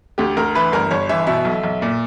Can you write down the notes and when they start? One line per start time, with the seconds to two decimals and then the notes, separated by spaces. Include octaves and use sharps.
0.18 D2 G4
0.37 D2 A#4
0.55 E3 B4
0.72 G1 A#4
0.91 G1 C#5
1.09 E3 E5
1.27 B2 E5
1.45 B1
1.64 B1
1.82 A#2